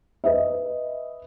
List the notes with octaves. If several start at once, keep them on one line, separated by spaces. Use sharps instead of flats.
B4 D#5 E5